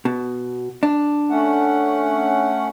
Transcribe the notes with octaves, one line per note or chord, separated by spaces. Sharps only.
B2
D4
A3 C#4 F#5